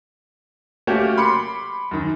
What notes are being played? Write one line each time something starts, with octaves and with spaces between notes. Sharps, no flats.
A3 A#3 C#4 F#4 G4
B5 C6 D6 C#7
F#2 D#3